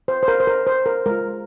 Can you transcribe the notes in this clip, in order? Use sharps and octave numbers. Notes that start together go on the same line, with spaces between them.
C5
C5
A#4
C5
A#4
C5
A#4
G#3 F4 A#4